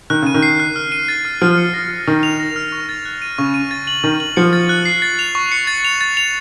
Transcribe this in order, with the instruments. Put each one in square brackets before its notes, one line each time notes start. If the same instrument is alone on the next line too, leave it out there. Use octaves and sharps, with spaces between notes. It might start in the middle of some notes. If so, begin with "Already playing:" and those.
[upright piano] D#3 [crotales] F#6
[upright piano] C#3 [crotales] D#7
[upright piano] D#3
[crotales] C7
F#6
F6
D#7
A6
F6
[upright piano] F3 [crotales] F6
[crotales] C#7
A#6
F6
[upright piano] D#3 [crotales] F6
[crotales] F7
A#6
F6
C#6
A6
F#6
D#7
[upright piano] C#3 [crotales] C#6
[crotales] D#7
A6
F#7
[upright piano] D#3 [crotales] A6
[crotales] F#7
[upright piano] F3 [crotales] C#7
[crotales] A6
F#6
C7
A6
F7
C#6
C#7
A6
F7
A6
F7